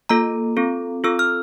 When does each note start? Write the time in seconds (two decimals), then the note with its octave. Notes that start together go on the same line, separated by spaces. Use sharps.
0.09 A#3 F4 A4 A#5
0.57 C4 F4 A4
1.04 C4 F4 A4 E6
1.19 F6